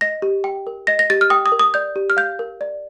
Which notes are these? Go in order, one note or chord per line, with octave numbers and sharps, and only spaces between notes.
D#5 A#6
G4
G5
A#4
D#5 A#6
A#6
G4 A6
F6
G5 D#6
D#6
A#4
D#6
D5 G6
G4
F6
F5 G6
A#4
D5